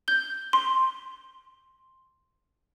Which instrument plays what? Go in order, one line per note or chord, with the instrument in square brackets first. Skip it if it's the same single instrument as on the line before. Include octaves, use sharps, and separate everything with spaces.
[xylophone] G6 G7
C6